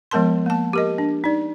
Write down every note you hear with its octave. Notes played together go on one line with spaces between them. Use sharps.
F3 G#3 B3 A#4 A5 C6
A#3 A5
G4 A#4 D#5
D4
D#4 D5